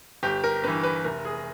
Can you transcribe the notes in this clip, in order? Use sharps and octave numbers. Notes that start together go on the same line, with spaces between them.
G1 G4
A#4
G2 E3 B4
B4
F1 A#4
G#4